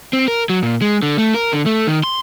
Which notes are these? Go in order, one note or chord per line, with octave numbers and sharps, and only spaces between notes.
C4
A#4
F#3
A#2
G#3
D3
A3
A#4
D3
A3
D#3
C6